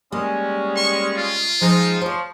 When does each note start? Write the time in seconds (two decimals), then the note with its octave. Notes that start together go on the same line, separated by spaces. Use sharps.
0.12 G3 G#3 A#3 C#4
0.77 C#6
1.17 F4
1.61 F3 G#3 D#4 C5
2.01 F3 C5 C#5